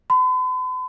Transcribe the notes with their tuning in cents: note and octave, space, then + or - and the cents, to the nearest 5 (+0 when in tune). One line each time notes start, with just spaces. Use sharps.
B5 +45